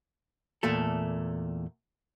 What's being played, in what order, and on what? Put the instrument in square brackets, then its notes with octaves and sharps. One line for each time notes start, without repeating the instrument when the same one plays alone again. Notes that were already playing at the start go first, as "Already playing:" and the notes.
[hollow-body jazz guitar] E2 A#2 A3 A4